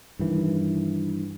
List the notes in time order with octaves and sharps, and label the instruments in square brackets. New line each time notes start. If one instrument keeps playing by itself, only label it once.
[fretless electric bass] G2 D#3 E3